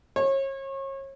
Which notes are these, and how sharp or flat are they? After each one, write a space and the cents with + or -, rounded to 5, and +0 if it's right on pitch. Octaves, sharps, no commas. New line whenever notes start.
C#5 -35